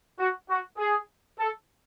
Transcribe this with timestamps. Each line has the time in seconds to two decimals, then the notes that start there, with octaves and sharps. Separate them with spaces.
0.19 F#4
0.49 F#4
0.78 G#4
1.38 A4